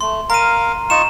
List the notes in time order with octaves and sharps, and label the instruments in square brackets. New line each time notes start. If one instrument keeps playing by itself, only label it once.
[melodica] A3 [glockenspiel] C6
[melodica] A#4 F5 [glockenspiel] A#5 D#7
[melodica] D#4 F4 C#6 [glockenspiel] E7